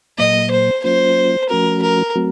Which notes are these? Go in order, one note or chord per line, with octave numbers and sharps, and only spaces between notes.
A#2 F#3 A#3 D#5
C5
F#3 A#3 C#4 F4 C5
F3 A3 C#4 F#4 A#4
A#4
F#3 A3 C4 F#4